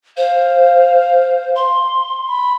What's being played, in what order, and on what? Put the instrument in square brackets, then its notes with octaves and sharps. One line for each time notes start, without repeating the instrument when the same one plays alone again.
[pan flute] C5 [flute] F5
[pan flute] C6
[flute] B5